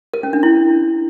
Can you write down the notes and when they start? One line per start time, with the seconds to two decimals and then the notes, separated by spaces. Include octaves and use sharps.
0.14 A#4
0.23 C#4
0.33 D4
0.43 E4